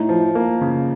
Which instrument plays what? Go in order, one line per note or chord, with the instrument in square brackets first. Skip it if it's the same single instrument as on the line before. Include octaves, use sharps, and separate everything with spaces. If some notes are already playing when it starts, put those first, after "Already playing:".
Already playing: [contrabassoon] A2 [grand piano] D#4
[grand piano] F3
A#3
C#3